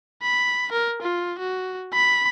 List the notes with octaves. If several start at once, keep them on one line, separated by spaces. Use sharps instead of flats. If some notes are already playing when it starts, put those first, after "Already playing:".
B5
A#4
F4
F#4
B5